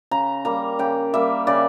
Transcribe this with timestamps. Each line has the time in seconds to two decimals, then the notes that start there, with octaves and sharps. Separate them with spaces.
0.11 C#3 A#5
0.45 G3 A#3 A#5
0.79 C#3 G5
1.14 G3 A#3 E5
1.47 C#3 D5